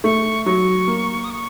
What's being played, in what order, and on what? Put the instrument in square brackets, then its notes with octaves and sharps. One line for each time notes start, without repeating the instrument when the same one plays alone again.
[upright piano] A3 [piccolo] C#6
[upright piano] F#3 [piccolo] C#6
[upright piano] A#3
[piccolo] D#6
C#6